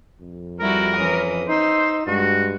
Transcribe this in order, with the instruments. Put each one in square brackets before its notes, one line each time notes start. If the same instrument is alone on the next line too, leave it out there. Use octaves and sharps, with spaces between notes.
[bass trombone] F2
[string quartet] G3 E4 F#4 [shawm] A#4
[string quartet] E3 C#4 D#6
[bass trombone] D#4 [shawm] C5 [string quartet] E6
[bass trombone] G2 [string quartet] G#3 [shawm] F#4